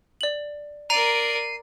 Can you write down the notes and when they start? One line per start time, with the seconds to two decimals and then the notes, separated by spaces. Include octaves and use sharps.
0.21 D5 F#7
0.90 A#4 D5 A#5 C7 D#7